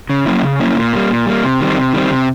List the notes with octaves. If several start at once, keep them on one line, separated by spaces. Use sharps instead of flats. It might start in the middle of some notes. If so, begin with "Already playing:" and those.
C#3
F#3 A#3 C#4 E4
C#3
F#3 A#3 C#4 E4
A#2
G3 A#3
A#2
G3 A#3
C3
D#3 G3 C4
C3
D#3 G3 C4
C3